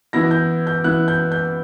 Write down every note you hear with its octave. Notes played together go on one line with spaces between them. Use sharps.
E3 B3 E4 A#6
G6
G6
E3 B3 E4 F#6
G6
G6